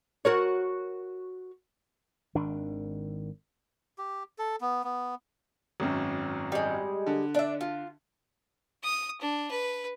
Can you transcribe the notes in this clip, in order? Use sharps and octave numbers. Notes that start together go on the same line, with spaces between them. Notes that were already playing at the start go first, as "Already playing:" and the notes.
F#4 A#4 C#5
G#1 D#3 D4
G4
A4
B3
B3
G#1 F#2
G3 G#3
D3
D4 E5
F4
D#6
D4
B4